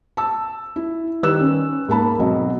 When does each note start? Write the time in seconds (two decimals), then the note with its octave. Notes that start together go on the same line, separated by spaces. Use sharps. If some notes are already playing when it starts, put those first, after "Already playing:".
0.17 A5 E6
0.76 E4
1.23 D#3 G3 B4 E6 F#6 E7
1.41 C#4
1.88 G#2 A#3 A5 B5
2.19 B1 F#3 C4 D#5